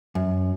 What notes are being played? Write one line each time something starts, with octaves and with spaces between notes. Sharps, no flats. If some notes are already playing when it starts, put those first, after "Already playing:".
F#2